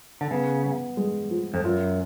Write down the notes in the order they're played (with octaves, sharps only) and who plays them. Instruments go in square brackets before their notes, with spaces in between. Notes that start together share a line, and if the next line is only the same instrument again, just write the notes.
[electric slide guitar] D3
[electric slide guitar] C#3 [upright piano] B3
[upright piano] B3
G#3
F3
[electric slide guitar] F2
[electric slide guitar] F#2 [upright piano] F4